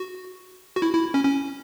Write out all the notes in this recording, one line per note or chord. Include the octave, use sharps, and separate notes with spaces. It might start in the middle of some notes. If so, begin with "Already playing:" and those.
Already playing: F#4
F#4
E4
E4
C#4
C#4